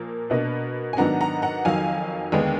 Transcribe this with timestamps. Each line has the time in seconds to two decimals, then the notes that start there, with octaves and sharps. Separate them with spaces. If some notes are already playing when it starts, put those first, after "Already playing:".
Already playing: A#2 F3 A#3
0.30 B2 A#3 D4 B4 D#5
0.93 G#5
0.97 G#2 D#3 F#3 B3 D4 F#5 A#5
1.21 F#5 A#5
1.42 F#5 A#5
1.65 F2 D#3 F#3 F5 G#5
2.32 D#2 D3 G#3 B3 D4